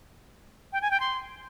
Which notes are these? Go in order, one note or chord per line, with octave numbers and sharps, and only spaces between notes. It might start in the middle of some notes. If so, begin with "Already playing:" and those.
G5
G#5
G5
C6